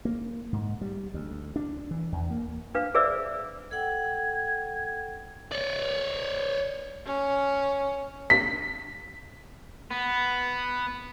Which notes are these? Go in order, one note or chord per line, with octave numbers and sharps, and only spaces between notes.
A#3
G#2
G3
D2
D4
E3
E2
A#3
D4 B4 F5
G#4 B4 C5 D5 E5 E6
A4 F#5 G5 G#6
C#5 D5
C#4
B6
B3